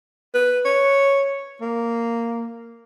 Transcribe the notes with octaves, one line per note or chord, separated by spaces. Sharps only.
B4
C#5
A#3